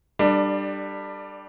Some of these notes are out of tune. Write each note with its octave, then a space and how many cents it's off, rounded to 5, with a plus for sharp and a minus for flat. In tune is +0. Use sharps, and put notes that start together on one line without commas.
G3 +0 D4 +20 A4 +20